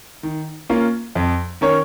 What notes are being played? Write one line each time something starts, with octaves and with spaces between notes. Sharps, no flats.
D#3
A#3 C#4 F4
F2
D#3 C#4 A#4 C#5